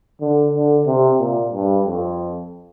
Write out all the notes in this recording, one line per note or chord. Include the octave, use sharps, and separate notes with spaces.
D3
D3
C3
A#2
G2
F2